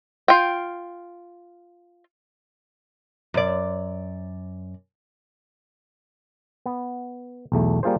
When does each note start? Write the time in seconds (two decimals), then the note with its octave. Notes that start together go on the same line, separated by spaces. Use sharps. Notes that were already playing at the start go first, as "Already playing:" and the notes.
0.28 F4 G5
3.34 F#2 D5
6.66 B3
7.52 B1 E2 A3
7.83 G3 A#3 F4 G#4 C5